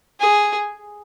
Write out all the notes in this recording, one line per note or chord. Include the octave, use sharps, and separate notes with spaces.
G#4